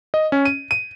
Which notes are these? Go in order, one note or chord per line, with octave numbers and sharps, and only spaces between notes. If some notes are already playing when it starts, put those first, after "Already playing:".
D#5
C#4
D#7
D#7